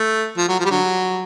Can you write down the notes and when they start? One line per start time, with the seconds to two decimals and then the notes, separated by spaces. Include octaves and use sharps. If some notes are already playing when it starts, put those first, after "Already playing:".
Already playing: A3
0.37 F3
0.48 F#3
0.59 F3
0.65 G3
0.70 D3 F#3